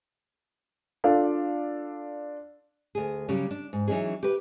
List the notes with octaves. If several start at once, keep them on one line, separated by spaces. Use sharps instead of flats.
D4 F4 A4 D5 F5
D2 G#4
C#3 F#3 G3 C#4 G4
D4
G#2
E3 F#3 C#4 D#4 G#4
G4 B4